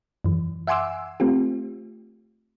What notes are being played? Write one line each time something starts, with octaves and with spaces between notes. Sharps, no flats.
F#2 E3
E5 F#5 G#5 C6 D6 E6
A3 C4 F4 G4